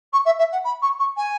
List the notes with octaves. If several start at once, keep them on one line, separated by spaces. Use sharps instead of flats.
C#6
E5
E5
F#5
B5
C#6
C#6
G#5